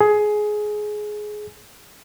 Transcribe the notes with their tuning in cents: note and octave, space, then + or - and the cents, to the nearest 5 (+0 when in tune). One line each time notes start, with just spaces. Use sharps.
G#4 +15